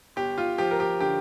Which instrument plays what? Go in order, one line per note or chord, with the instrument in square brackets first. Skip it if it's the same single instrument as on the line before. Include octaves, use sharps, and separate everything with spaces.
[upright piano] G1 G4
F4
F3 G4
A#4
G4
D3 G4